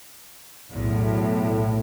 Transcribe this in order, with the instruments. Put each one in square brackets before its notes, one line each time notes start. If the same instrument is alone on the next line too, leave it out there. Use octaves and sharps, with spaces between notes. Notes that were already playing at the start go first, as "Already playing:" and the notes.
[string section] B1 E2 [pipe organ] A2